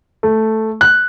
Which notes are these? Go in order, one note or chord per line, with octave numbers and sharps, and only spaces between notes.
A3
F#6